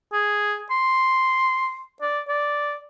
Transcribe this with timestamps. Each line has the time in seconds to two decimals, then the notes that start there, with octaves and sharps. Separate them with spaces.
0.13 G#4
0.71 C6
2.02 D5
2.28 D5